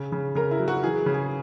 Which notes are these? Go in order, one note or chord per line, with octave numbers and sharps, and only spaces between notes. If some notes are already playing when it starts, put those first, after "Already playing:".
Already playing: C#3
C#3
C#3 A#4
E4
F#3
F#4
E3 G#4
C#3
G#4